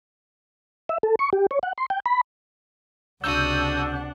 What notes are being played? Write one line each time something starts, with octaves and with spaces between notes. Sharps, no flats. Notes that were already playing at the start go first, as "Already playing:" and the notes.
E5
A4
C#6
G4
C#5
F#5
C6
G5
B5
C#2 C3 D4 F#4 F#5 D#6 E6 G6